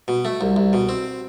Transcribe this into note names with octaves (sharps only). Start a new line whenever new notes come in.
B2
A3
C2
C2
B2
C4